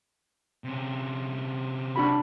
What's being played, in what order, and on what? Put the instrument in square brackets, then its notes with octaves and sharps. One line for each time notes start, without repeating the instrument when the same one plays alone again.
[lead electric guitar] C3 C#4
[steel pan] D4 F#4 B5